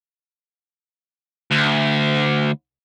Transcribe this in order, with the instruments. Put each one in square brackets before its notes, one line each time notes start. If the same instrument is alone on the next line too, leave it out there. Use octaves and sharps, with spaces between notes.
[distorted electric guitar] D2